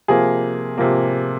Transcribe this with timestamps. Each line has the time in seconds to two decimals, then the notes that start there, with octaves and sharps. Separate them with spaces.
0.08 C3 F3 A#3 G#4
0.78 C3 F3 A#3